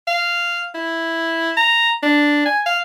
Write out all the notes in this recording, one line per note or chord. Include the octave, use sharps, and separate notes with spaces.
F5
E4
A#5
D4
G#5
F5